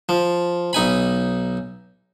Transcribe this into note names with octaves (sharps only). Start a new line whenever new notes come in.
F3
B1 D#4 G#5 B5